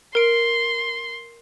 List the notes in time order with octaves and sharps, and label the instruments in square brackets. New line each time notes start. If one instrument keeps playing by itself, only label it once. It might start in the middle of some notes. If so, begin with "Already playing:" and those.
[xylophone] A#4 D7 [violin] C6